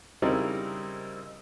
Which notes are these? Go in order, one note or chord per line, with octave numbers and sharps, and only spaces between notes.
C#3 G3 C4 D#4 E4 A#4